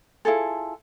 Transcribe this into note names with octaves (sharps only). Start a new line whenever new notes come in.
E4 F4 G#4 A4